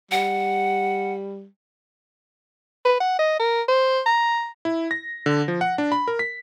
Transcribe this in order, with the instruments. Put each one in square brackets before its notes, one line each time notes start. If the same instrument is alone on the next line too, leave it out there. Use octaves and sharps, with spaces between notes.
[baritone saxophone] G3 [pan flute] F#5
[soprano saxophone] B4
F#5
D#5
A#4
C5
A#5
[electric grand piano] E4
A#6
D3
F3
F#5
D4
B5
A#4
B6